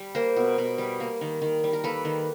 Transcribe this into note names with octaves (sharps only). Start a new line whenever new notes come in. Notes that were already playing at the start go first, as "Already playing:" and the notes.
Already playing: G3
A#3 A#4 C5
B2
B2
G3
A#3
D#3
D#3
G3
A#4
A#3 A4 B4
D#3